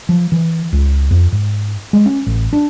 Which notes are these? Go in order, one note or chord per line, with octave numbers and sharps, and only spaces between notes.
F3
E3
C#2
F2
G#2
G#3
C#4
A1
D4